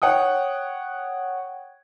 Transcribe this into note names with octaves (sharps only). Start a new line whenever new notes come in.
C#5 F#5 G5 D#6